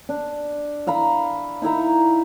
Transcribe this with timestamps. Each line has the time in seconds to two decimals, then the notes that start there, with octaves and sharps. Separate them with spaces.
0.09 D4
0.87 E5 F5 A#5 B5
1.62 D#4 E4 E5 A#5